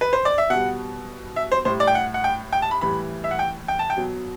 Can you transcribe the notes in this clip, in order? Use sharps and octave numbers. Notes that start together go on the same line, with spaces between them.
B4
C5
D5
E5
B2 G3 F#5
E5
C5
A2 G3 C5
D5
G5
F#5
F#5
G5
G5
A5
B5
A2 E3 G3 B5
E5
F#5
G5
G5
A5
G5
B2 F#3